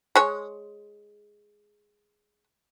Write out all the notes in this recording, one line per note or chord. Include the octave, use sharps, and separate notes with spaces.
G#3 C#5